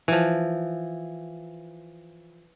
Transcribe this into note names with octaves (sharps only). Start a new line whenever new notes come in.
E3 F3